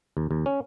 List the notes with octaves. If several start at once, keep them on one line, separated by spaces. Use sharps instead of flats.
D#2
D#2
C#4